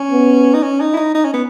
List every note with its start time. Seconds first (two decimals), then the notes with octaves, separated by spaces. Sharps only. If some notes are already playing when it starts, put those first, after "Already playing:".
Already playing: C#4
0.11 B3
0.54 D#4
0.63 C#4
0.80 D#4
0.93 E4
0.97 D#4
1.14 D#4
1.24 C#4
1.33 B3